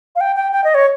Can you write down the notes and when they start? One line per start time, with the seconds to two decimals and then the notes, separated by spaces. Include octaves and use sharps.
0.16 F5
0.21 G5
0.36 G5
0.52 G5
0.64 D#5
0.74 C#5